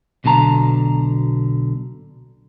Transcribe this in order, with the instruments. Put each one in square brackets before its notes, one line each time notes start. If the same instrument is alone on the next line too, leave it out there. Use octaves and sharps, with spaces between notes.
[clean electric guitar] B1 B2 D3 A5 A#5